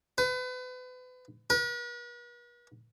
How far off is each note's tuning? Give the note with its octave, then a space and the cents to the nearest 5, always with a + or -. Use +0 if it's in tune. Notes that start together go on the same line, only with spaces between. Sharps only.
B4 +35
B4 -45